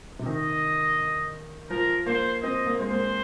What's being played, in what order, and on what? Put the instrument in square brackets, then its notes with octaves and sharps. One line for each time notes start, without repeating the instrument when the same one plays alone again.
[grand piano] C3
[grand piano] D#3 [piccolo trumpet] D#5
[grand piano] F3 [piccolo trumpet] A#4
[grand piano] A#3 [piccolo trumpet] C5
[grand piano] C4 [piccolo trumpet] D#5
[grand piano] A#3
[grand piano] G#3 [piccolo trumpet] C5
[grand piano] A#3